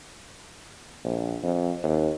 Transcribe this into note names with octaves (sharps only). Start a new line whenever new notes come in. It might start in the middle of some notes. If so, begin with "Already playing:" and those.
A#1
F2
D#2